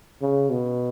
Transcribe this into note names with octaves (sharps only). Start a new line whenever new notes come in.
C#3
B2